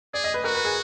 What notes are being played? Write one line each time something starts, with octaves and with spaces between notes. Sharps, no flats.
G#4 D5
D#5
B4
F#4 A#4
B4
G#4